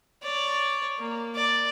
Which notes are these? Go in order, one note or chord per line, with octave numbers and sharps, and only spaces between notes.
C#5 D5
A#3
D5